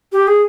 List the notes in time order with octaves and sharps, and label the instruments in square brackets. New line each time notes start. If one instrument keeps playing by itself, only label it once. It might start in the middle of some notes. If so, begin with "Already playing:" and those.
[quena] G4
G#4